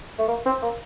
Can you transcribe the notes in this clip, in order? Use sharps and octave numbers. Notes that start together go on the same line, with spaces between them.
A3
A#3
C4
A#3